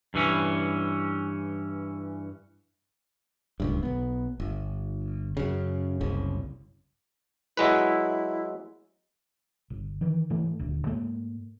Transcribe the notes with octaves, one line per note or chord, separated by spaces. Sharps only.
G2 E3 C#4
D1 C#2 G2
B1 B3
G1
F#2 C#3
F#1 C2 C#3
F#3 G#3 E4 B4
G1
D#3 E3
G#2 E3 A3
D#1 D2
G#2 A3 A#3